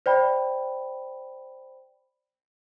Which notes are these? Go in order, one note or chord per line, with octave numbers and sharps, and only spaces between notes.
C5 D5 G5 B5